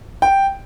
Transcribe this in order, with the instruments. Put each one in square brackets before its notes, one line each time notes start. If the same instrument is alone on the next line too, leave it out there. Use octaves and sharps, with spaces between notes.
[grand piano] G5